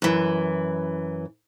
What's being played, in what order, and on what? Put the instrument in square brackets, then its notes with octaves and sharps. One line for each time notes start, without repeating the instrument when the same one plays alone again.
[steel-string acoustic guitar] F#2 E3